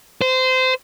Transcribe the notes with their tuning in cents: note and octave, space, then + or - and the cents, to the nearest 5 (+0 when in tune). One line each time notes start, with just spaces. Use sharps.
C5 -20